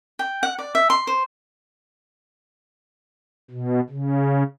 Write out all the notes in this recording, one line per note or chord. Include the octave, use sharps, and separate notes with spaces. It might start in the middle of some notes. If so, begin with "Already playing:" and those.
G5
F#5
D5
E5
C6
C5
B2
C#3